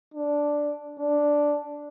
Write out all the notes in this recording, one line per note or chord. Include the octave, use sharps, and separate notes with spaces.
D4
D4